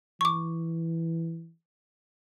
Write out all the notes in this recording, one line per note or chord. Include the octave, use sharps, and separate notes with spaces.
E3 C#6 D6